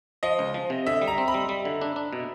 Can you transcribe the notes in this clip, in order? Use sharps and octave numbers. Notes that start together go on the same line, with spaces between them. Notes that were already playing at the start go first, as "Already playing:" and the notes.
F3 D#5
C#2
F3
C3
D3 E5
G3
A#5
C4
B5
G3
G3
D3
D4
D4
B2